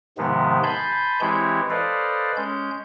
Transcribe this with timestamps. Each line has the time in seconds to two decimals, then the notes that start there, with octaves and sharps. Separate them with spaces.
0.18 G#2 C3 D#3 F3 G#3 B3
0.63 G#5 A5 B5 C6 G6
1.21 E3 G#3 C4 E4 G4 C#5
1.70 A4 B4 C5 D5 D#5 F5
2.37 G#3 C#4 G6